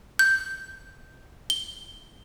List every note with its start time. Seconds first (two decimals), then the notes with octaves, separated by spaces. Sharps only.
0.19 G6
1.50 G7